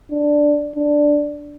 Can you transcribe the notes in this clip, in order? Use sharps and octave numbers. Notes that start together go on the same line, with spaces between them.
D4
D4